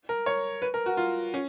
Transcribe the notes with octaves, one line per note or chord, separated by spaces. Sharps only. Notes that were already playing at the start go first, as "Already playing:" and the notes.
A#4
C#5
B4
A#4
F#4
F4
C#4